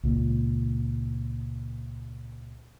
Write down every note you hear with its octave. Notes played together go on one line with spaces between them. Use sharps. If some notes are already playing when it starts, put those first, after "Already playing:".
C#2 A#2